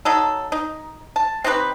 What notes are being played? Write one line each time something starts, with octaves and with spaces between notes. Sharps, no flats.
F#3 D#4 A4
D#4
A5
C4 D#4 G4 B4